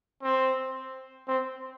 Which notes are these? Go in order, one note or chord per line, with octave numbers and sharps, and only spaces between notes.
C4
C4